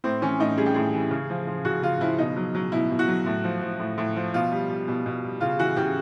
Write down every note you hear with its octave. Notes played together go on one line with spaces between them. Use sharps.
A2 C4
E3 C#4
A2 D#4
G3 G#4
G4
A2 G#4
E3
C#3
F3
F3
C#3 F#4
C#3 F4
F3 E4
B2 D#4
F#3
F#3
B2 E4
B2
F#4
F#3
A2
F3
F3
A2
A2
F3
B2 F4
G3
G3
B2
B2
G3
C#3 F4
E3 F#4
C#3 G4